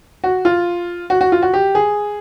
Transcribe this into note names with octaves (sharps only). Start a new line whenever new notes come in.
F#4
F4
F#4
F#4
F4
F#4
G4
G#4